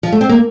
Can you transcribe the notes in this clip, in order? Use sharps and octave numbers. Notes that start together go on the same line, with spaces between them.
F3
A3
C4
A#3